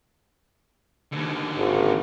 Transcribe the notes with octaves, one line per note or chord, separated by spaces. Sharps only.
D#2 D3
G#1